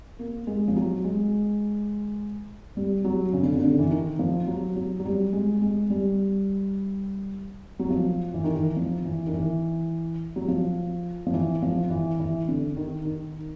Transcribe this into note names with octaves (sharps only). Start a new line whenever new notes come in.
A#3
G#3
F3
F#3
G#3
G3
F#3
C#3
D3
C#3
D#3
D3
E3
D#3
F3
F#3
F#3
F#3
G3
G#3
G#3
G3
F#3
F3
E3
D#3
E3
F3
E3
D#3
E3
F#3
F3
F3
E3
F3
E3
E3
D3
D#3
D#3